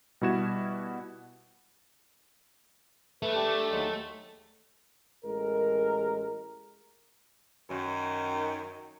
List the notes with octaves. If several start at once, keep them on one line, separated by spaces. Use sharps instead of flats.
B2 G3 E4 F#4 G#6 E7
A3 B4
D4 G4
D#2 F#3 G#3
A1 G#3 A#4
F#2 D#3